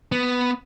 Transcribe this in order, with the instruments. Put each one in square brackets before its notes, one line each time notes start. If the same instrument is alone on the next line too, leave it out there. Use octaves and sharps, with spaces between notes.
[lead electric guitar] B3